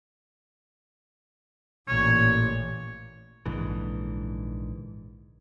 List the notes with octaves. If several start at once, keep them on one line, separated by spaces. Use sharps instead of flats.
A1 A#2 C#5
A#1 G#2 D3 E3